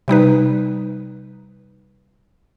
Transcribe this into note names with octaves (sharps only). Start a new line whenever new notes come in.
C3 G3 D#4 B4